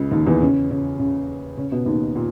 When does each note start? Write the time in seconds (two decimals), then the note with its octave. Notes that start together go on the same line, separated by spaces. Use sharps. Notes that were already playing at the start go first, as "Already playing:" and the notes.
Already playing: C#2 C#3
0.11 D#2 D#3
0.27 E2 E3
0.41 C#3 C#4
0.70 C#3 C#4
0.99 C#3 C#4
1.57 C#3 C#4
1.72 B2 B3
1.86 D#2 D#3
2.16 A#2